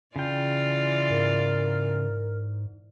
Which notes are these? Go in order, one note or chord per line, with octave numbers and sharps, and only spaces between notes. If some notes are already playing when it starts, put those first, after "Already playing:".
C#3 E3 F4 D5 G5
G#2 A#4